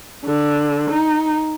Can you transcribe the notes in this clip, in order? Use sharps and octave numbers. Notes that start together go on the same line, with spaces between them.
D3
D#4